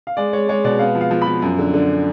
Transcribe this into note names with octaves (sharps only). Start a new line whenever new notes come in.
F5
G#3 D5
G#3 C#5
G#3 C#5
B2 D5
B3 F5
F3
F5
F3
B5
F3
F#2
D3
D3